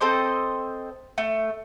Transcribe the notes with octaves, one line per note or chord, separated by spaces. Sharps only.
C4 A4 C5 D#5
A3